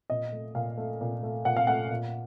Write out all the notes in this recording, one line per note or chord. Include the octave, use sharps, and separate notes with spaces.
A#2 D#5
A3
A#2 F5
A3
A#2
A3
A#2 F#5
F5
A3 F#5
A#2